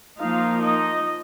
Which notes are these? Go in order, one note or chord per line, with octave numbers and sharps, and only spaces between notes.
F3 A#3 D#4 F4 F5
D#4 D#5